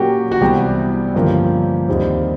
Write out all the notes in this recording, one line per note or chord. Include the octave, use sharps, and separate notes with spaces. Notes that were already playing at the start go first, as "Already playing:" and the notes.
Already playing: A#2 F#3 A#3 C#4 F#4 G4
F#4
C2 C3 E3 G3 B3 G4
G2 D3 F3 A#3 C#4
D#2 D#3 G3 C4